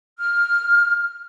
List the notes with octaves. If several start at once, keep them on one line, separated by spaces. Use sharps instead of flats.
F6